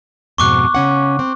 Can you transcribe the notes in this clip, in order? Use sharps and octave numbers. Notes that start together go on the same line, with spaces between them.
F2 G#2 B2 C#6 D6 F#6
C#3 C#4 F#5
C4